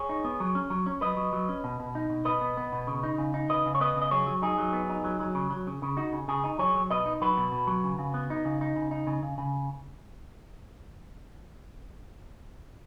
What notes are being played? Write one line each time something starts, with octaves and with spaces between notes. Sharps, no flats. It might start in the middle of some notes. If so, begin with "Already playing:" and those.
Already playing: G#4 C#5
D#4
B3
F#3
C#4
F#3
C#4
F#3 B4 D#5
F#3
F#3
C#4
B2
B2
D#4
B2
B2 B4 D#5
B3
B3
B2
C#3
D#4
C#3
D#4
C#3 B4 D#5
C#3
C#5
B3 B4 D#5
C#3
D#5
F#3 G#4 C#5
F#3
D#4 G#4
F#3
B3
D#4
F#3
F#3
C#3
F#3
C#3
C#3
D#4 F#4
C#3
C#3 G#4
D#4
F#3 G#4 C#5
F#3
B2 B4 D#5
D#4
F#3 F#4 B4
B2
B2
F#3
C#3
C#3
B3
D#4
C#3
D#4
C#3
D#4
C#3
C#3
C#3